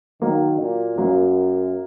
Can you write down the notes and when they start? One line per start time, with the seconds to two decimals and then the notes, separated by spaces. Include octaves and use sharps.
0.22 D#3 F#3 A#3
0.60 A#2
0.98 F#2 F#3 A#3